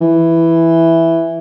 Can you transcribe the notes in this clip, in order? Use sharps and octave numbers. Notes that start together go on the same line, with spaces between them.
E3